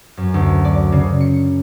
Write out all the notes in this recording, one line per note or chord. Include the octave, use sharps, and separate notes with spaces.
F#2
D2
D5
C#3
C#7